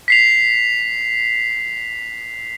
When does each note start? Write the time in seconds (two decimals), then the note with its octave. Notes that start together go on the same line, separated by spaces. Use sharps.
0.08 B6 C7 F7